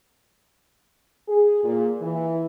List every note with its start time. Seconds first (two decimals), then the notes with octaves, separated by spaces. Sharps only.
1.28 G#4
1.64 A#2
2.01 E3